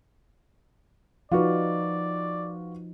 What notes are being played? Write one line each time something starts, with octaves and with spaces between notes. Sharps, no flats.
F3 D#4 F4 F#4 B4 D5